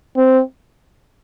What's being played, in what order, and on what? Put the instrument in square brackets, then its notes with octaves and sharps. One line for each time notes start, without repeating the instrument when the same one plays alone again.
[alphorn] C4